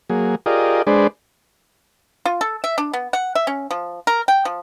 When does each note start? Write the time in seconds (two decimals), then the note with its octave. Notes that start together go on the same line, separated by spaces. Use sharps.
0.10 F#3 A#3 G#4
0.46 F4 G4 G#4 A#4 D5 D#5
0.87 G#3 D4 G#4 B4 C5 D5
2.25 F4
2.41 A4
2.64 E5
2.78 D4
2.93 B3
3.13 F#5
3.35 E5
3.47 C#4
3.71 F3
4.07 A#4
4.28 G5
4.45 F3